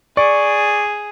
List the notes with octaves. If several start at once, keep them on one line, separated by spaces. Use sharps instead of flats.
G#4 D5 C#6